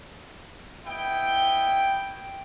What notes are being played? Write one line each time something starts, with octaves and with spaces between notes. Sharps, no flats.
B3 E4 D#5 G5